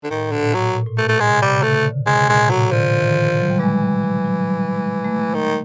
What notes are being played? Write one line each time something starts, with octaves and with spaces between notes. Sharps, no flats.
D3
A2 D#3
A#2 D3
A2
F#3
A#2
A2
A#2 A3
A3
G#3
C3
G3
C3
C#3
A3
D3
C3 G#3
A#2 G#3
A2 F#3
D3 F3
D#3
F#3
G3
E3 G#3
G3
F#3
F#3
F#3
G3
G#3
A3
D#3